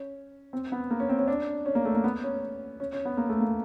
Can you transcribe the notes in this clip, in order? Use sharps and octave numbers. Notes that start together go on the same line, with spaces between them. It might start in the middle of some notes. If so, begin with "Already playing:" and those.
Already playing: C#4
C4
B3
A#3
C#4
C4
C#4
D4
C#4
A#3
A3
A#3
B3
C#4
C#4
C#4
B3
A#3
A3
A#3